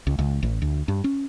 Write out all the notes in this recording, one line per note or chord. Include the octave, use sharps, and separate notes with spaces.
C#2
C#2
A1
D2
G2
C#4